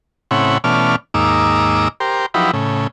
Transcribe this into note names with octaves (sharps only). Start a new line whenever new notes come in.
A2 C#3 C4 E4 C#5 F#5
B2 E3 A3 C#4 D5 F6
D#2 G#2 A#3 D#4 D6 E6
G4 A#4 C5
F3 F#3 D#4 E4 G4 B4
A2 C#3